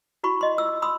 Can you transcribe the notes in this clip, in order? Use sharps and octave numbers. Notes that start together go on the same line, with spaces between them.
E4 F#4 B5 C#6
D#5 C6
F4 E6
B5 C6 D#6 E6